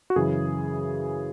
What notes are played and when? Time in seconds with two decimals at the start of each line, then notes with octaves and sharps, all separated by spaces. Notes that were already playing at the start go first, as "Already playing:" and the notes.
0.10 F#4
0.16 F#2 C#3 E3 G#4